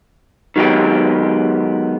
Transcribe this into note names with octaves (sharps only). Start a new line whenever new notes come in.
D#3 F#3 G#3 B3 G4